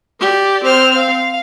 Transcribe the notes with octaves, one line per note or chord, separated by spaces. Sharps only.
G4 D5
C4 C5 F6
F5